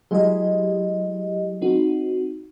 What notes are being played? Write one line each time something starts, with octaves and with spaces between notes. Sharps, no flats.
F#3 G#3 E4 G4 D#5
C4 D#4 F#4